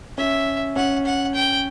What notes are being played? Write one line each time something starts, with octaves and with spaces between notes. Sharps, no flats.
C#4 E5
C#4 F#5
F#5
G5